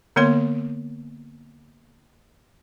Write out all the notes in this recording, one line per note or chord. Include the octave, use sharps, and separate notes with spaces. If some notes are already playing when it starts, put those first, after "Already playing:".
D3 A#3 B3 C#5 C6